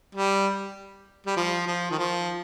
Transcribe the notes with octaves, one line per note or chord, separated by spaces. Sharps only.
G3
G3
F3
F3
D#3
F3